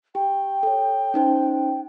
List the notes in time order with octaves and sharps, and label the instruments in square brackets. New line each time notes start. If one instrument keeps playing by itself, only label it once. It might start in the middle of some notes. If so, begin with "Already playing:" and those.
[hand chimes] G4 [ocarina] G5
[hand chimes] A4 C#5
C#4 D#4 C5